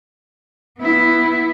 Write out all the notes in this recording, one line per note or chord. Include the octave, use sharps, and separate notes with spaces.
B3 E4